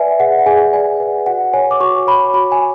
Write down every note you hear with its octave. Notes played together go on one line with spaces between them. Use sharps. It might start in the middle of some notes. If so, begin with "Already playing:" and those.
Already playing: B4 D5 E5 F#5 G#5
G#4 F#5
F#5
G#4 G#5
D5 G#5
B4 F#5
F#4 F#5
C#5 G#5
D6
F#4 C#6
C#5 B5
F#4 B5
G#5